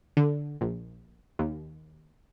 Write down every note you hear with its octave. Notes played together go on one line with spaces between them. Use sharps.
D3
A#1
D#2